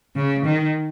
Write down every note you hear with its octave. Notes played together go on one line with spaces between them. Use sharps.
C#3
D#3